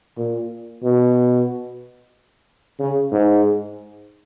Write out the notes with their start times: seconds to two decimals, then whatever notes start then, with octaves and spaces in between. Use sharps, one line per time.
0.18 A#2
0.83 B2
2.80 C#3
3.12 G#2